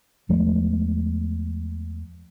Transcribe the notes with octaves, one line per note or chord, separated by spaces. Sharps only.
E2 F3 G#3 A3